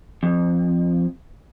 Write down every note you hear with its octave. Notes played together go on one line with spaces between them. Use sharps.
F2